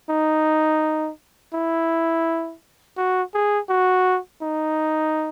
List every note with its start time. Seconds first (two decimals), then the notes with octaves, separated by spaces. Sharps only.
0.10 D#4
1.54 E4
2.97 F#4
3.34 G#4
3.69 F#4
4.42 D#4